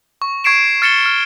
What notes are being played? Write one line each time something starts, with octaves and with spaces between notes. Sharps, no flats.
C#6
C#6 G#6 C7 D7 E7
F6 A6 C#7 E7 G7
F6